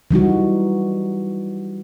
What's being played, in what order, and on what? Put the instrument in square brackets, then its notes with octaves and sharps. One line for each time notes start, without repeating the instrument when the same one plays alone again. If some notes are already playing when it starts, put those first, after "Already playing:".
[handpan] E3 G3 D#4 F#4